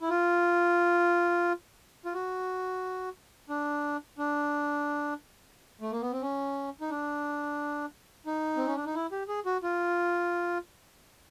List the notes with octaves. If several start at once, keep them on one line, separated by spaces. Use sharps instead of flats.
E4
F4
F4
F#4
D4
D4
A3
A#3
B3
C4
C#4
D#4
D4
D#4
C4
C#4
D4
D#4
E4
G4
G#4
F#4
F4